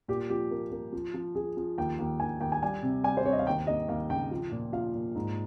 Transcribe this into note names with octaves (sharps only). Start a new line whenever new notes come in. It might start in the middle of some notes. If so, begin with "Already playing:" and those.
A#2 G4
F3 G4
A#3
A#3
F3
F3
F3 G#4
F3
D#2 G5
D#2
D#2 G#5
D#2 G5
G#5
G3 G#5
C3
G3 G#5
C5
C4 C#5
D#5
F5
D#2 G5
D#2 D#5
D#2 F5
C#3 G5
F3
A#2
F3 F5
A#2
G#2